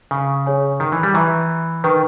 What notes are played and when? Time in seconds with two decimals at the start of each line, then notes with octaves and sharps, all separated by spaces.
0.11 C#3
0.46 G#4 C#5 G#5
0.80 D#3
0.92 E3
1.03 G3
1.14 E3 B4 E5 A#5 C#6
1.84 D#3 B4 G5 A#5 C#6